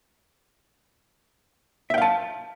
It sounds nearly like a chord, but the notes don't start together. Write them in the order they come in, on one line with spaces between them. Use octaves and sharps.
E5 G5 F5 A5